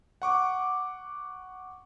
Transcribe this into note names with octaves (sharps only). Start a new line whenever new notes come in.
F#5 C#6 D6